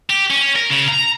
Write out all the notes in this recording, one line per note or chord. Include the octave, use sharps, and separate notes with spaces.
G4
C#4
A#4
C#3
A#5